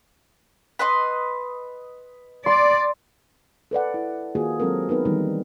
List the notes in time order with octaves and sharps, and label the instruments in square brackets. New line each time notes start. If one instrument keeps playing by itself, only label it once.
[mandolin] B4 D#5 C6
[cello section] D5 [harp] C6
[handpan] A4 B4 D5 F#5
E4
D#3 A#3 F4 F#4 G#4
F#3 G#3 C4 A4 A#4
B3 D#4 A#4 B4
D#3 E3 G3 A#3 B3 D#4